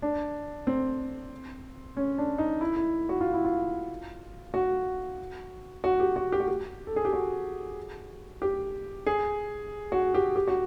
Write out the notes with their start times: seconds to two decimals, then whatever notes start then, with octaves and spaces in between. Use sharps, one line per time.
0.02 D4
0.67 C4
1.97 C#4
2.18 D4
2.38 D#4
2.61 E4
2.76 E4
3.09 F#4
3.21 F4
3.34 E4
3.45 F4
4.54 F#4
5.84 F#4
6.00 G4
6.16 F#4
6.32 G4
6.40 F#4
6.48 G4
6.87 A4
6.96 G#4
7.05 G4
7.13 F#4
8.42 G4
9.07 G#4
9.92 F#4
10.14 G4
10.36 G4
10.47 F#4